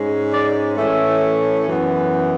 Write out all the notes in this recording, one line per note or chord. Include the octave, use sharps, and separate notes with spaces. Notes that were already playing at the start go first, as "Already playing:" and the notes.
Already playing: G#2 G#3 C#4
D5
A2 E3 A3 C#4 E5
F#2 E3 B3